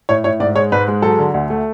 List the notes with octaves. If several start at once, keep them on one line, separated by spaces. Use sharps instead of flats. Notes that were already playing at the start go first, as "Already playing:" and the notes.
A2 C#5
A2 C#5
G#2 D5
G#3 C#5
G#2 B4
G#3
F#3 A4
D3
D2
A3